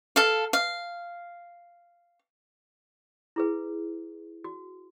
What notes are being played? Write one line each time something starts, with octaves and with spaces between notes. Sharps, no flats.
A4 F5
F5
E4 G#4 B4
F#4